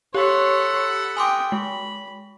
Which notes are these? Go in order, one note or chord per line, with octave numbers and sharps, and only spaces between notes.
G4 A4 C#5 F#5 B5 C6
G5 G#5 C6 D6 D#6
G#3 B5